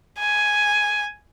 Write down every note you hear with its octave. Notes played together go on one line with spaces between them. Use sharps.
G#5